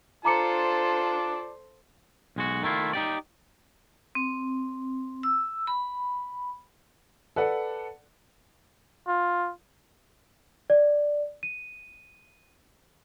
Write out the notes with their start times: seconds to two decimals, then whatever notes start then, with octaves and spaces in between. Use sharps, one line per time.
0.25 F4 A4 C5 D5 A5 A#5 D6 C#7
2.36 B1 G#3 F#4
2.63 D#3 A3 E4 F4
2.93 D#4 G4 D5
4.15 C4
5.23 E6
5.67 B5
7.36 A4 B4 D5 F#5
9.07 F4
10.70 D5
11.43 D#7